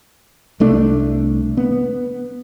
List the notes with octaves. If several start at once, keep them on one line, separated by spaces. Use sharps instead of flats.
C2 A3 D4
B3